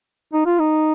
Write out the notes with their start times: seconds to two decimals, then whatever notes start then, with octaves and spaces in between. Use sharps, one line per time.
0.33 D#4
0.46 F4
0.60 D#4